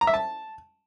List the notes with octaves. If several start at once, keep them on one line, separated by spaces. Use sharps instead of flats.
A#5
E5
A5